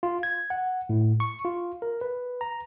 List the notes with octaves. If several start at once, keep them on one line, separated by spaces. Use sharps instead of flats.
F4
G#6
F#5
A2
C#6
F4
A#4
B4
A#5